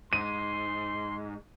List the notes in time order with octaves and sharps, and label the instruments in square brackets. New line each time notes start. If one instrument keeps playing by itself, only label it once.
[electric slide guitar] G#2 [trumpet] C6 [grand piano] D#7